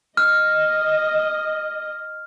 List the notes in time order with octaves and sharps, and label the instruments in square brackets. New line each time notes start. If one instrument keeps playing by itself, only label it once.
[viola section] D#5 [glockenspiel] F6